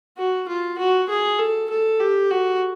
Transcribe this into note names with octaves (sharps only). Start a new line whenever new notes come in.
F#4
F4
F#4
G#4
A4
A4
G4
F#4